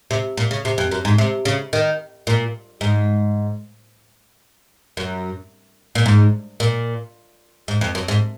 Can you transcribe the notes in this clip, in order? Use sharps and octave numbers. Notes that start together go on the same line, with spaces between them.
C3
A#2
C#3
C3
F2
F#2
G#2
C3
C#3
D#3
A#2
G#2
F#2
A#2
G#2
A#2
G#2
F2
F#2
G#2